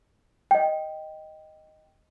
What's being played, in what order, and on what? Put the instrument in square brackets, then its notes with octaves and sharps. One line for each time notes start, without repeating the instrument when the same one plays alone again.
[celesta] D#5 G5